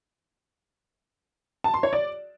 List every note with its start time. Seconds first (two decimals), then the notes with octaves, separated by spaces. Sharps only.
1.64 A5
1.74 C6
1.83 C#5
1.93 D5